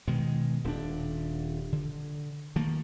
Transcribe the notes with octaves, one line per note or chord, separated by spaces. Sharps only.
B2 D#3 G#3
D#1 C4 D4
D3
D#3 F3 A3 A#3